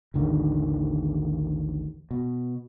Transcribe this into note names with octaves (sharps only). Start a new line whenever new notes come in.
A1 D#2 D3 D#3
B2